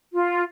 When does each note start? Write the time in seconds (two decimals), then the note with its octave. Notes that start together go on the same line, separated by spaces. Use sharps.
0.13 F4